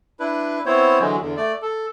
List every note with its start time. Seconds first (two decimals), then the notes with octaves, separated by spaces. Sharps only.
0.20 D4 E4 B4
0.66 B3 C4 E4 C5 C#5
1.00 D3 E3 F#3 G#3
1.21 E2 D3
1.37 A3 D5
1.62 A4